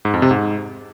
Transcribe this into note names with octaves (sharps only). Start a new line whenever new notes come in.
G#2
F2
C3
G#2